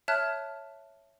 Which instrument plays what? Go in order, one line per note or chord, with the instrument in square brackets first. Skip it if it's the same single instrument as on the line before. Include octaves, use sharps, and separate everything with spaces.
[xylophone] C#5 E5 A5 F6 F#6